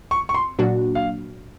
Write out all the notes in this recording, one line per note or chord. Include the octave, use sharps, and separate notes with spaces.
C#6
C#6
C6
A#2 F#3 A#3 D4 F#4
F5